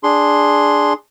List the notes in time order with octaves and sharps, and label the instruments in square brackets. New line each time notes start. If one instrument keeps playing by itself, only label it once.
[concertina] D4 G#4 C6